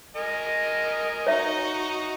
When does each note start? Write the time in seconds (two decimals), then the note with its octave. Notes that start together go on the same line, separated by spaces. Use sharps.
0.16 A#4 D#5 G#5
1.27 D#4 F#4 C#5 E5